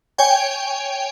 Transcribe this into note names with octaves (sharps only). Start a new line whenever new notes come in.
C#5 G5 G#5